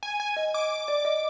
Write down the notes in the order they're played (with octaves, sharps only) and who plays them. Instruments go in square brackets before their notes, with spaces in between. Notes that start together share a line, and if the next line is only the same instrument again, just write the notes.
[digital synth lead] G#5
G#5
[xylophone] D#5
[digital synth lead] D6
[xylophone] D5
D#5